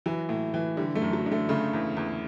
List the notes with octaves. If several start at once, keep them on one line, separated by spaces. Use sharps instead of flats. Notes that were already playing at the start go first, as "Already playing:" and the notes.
E3 F#3
A2
E3
D3 G3
A3
F#2
F#3
D3
A3
C#3 A3
E2
E2